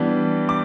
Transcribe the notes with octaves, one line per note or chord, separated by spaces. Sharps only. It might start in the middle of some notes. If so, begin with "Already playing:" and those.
Already playing: E3 G3 B3 D4
D6